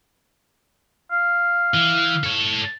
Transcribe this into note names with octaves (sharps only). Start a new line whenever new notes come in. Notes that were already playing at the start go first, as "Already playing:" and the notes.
F5
E3
A4 C#5